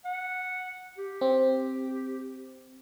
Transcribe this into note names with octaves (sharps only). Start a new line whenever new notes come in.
F#5
G4
C4